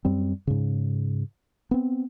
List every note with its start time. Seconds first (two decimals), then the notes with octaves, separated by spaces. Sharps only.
0.05 F#2 G3 C4
0.47 G#2 C#3
1.71 B3 C4